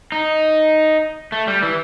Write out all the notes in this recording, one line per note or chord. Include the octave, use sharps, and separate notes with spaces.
D#4
A3
G3
E3